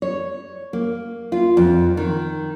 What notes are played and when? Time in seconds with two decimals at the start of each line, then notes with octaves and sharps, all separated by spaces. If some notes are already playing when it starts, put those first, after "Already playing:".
0.02 C#5
0.73 A#3
1.32 F4
1.57 F2
1.97 D#3